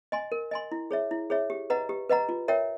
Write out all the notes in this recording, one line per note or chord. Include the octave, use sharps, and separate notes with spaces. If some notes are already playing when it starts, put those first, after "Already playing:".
D#5 G#5 C6
A#4
D#5 G#5 C6
E4
G#4 C#5 E5
E4
G#4 C#5 E5
G4
B4 D#5 F#5 A#5
G4
B4 D#5 F#5 A#5
F4
A#4 C#5 E5 G5